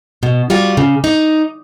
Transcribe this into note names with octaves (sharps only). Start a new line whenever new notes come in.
B2
G3 F4 F#4
C#3
D#4